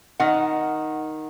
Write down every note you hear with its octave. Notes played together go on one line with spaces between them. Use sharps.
D#3 F#5